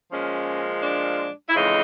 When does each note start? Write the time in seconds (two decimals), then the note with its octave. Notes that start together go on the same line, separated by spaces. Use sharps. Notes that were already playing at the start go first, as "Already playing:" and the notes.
0.11 A#2 F3 G#3 C#4
0.83 D4
1.49 E4
1.55 F2 C#3 E3 G#3 D#4